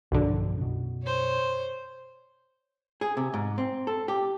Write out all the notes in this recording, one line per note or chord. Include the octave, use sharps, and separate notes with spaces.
B1 G2 B2 D3 F3
F#2 B2
C5 C#5
G#4
C3
G#2
C4
A4
G4